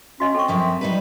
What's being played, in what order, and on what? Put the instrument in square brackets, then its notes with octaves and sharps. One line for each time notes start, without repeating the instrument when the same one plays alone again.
[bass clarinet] C#4 [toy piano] F#4 D#5 C6
[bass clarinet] C4 [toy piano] A4 C#6
[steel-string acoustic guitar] F#2 F3 E5
[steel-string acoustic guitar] F#3 D#4 B4 [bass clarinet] G3